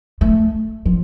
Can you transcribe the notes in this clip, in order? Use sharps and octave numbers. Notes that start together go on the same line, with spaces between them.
A3
F3